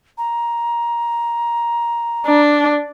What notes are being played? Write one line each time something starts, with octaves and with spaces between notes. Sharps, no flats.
A#5
D4